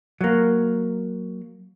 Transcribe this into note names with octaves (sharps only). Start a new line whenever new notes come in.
F#3 A#3